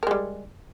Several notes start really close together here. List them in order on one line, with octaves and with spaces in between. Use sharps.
A#4 G#3 G3